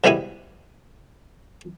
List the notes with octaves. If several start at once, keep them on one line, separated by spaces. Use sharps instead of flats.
G#2 B2 G3 G#3 E4 G#5